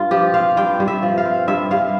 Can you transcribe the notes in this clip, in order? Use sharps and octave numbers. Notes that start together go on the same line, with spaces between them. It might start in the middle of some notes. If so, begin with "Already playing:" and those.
Already playing: G2 F4
F3 G4
C4 F5
G2 G5
G2
E5
F3
F5
C4
G2 E5
G2 F5